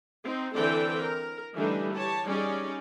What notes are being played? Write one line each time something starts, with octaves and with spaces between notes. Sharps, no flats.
C4 D#4
D3 E3 C4 A4 D5 G5
A#4
D3 E3 G3 A3 D4 D#4
G4 C#5 A5
G3 C#4 D#4 G#4 D5